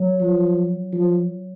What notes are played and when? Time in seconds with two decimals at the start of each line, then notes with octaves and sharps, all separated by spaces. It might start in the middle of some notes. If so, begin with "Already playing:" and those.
Already playing: F#3
0.21 F3
0.93 F3